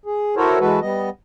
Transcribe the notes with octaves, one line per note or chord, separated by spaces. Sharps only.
G#4
E4 F#4 A4 A#4 C5 C#5
E3 G#3 F#4 A4 B4
G3 B3 D#5